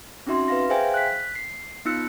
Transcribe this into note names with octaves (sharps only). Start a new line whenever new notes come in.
C4 C#4 D#4 F#4 E5 C6
B4 F5 A#6
G#4 C5 E5 F5 G5 G#5
F#6 B6
C7
B3 D#4 F4 E6 F#6 C#7